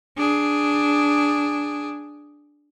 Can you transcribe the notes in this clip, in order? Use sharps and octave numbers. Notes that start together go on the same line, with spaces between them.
D4 G#4